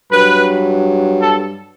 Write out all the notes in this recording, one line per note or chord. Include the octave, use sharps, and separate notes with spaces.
G2 F#3 B4
A4